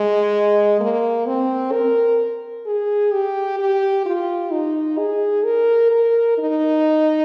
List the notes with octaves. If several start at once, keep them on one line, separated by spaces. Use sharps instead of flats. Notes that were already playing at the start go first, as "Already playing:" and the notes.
Already playing: G#3
A#3
C4
A#4
G#4
G4
G4
F4
D#4
G#4
A#4
A#4
D#4